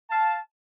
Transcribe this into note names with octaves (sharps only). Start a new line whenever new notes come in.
F5 A5